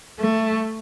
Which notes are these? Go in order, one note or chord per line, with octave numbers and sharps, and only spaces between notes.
A3